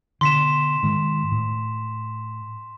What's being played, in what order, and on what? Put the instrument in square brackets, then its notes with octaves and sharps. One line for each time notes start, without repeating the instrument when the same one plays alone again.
[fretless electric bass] B2 D3 [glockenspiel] C6 B6 E7
[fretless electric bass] G#2 D#3 G#3
A2